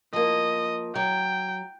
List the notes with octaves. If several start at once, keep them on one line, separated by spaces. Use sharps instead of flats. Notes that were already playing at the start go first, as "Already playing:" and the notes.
F3 A#3 D#5
F#3 G5